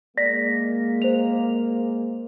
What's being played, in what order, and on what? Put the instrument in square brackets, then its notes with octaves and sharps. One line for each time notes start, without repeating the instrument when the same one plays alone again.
[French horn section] G#3 A#3 [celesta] D5 A#6 B6
[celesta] C5 F7